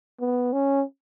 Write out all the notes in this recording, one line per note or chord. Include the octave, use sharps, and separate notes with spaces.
B3
C#4